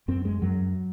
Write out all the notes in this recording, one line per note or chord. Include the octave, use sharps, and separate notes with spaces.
F#2 C4
G#3
F#2 F#3